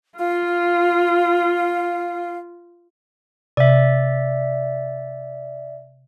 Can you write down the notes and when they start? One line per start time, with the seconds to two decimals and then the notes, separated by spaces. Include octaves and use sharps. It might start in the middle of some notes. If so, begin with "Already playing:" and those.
0.19 F4 F5
3.57 C3 D5 E5